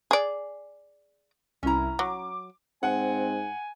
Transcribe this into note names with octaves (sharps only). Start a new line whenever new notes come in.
G#4 D5
C2 C#4 E4 A#5
F#3 D6
G#2 C4 F#5 G#5